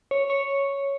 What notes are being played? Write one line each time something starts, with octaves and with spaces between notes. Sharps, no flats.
C#5
C#5